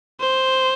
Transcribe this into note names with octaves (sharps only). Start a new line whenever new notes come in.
C5